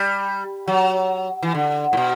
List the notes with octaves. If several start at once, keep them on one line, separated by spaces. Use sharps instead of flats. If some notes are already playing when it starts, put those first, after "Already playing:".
Already playing: G3
F#3
E3
D3
A2
B2